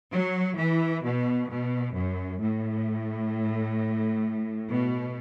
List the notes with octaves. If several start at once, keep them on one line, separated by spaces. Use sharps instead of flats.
F#3
E3
B2
B2
F#2
A2
B2